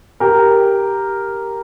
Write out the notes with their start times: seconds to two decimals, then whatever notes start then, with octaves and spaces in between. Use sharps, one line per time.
0.20 G4 A#4